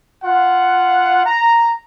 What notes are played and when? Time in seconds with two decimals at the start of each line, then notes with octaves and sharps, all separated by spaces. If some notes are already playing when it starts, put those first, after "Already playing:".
0.24 F4 F#5
1.26 A#5